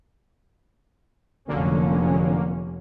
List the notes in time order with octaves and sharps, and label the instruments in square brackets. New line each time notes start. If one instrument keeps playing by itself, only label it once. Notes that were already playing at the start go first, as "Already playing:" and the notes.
[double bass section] F1 C#4 [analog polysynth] D3 F#3 A#3